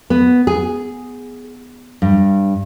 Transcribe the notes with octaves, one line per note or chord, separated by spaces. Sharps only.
B3
G#4
G2